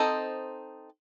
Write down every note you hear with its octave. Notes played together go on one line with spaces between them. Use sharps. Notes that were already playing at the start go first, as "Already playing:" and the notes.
Already playing: C4 D#4 A4 C5 D#5